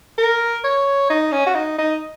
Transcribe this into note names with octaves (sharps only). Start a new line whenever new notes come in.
A#4
C#5
D#4
C#4
F#4
D#4
D#4